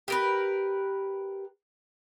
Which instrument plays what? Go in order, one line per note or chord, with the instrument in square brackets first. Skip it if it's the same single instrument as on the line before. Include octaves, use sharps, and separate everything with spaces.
[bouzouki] G4 A#4 B4